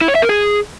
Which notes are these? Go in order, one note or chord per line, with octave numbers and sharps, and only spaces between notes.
E4
C#5
E5
A#4
G#4